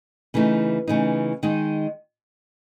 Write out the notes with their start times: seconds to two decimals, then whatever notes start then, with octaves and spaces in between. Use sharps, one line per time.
0.34 C#3 E3 A3 D#4
0.88 C#3 E3 A3 D#4
1.43 D#3 G#3 D#4